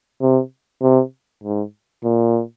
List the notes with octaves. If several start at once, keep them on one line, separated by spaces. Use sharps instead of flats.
C3
C3
G#2
A#2